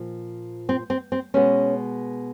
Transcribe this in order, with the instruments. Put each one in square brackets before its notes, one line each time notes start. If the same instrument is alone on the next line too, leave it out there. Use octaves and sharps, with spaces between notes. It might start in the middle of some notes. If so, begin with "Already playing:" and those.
Already playing: [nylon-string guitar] A#2 F3
C4
C4
C4
B2 G#3 B3 C#4